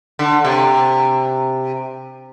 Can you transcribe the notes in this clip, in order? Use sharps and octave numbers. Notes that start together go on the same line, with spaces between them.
D3
C3